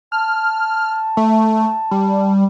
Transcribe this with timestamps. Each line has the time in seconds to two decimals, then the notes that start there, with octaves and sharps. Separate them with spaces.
0.12 A5 F6
1.17 A3
1.91 G3